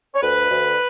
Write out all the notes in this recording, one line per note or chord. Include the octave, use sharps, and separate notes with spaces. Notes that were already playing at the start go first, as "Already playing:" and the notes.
C#5
D2 B4
D2